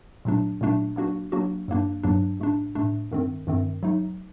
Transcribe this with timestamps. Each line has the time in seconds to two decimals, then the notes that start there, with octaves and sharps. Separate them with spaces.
0.25 A#2 F#3 A3 D4
0.61 A#2 F#3 A3 D4
0.96 F#3 A#3 D4 F#4
1.32 F#3 A#3 D4 F#4
1.68 G2 F#3 A#3 D4
2.03 G2 F#3 A#3 D4
2.40 A2 A3 D4
2.75 A2 A3 D4
3.11 G2 D#3 A3 C4
3.47 G2 D#3 A3 C4
3.83 F#3 A3 D#4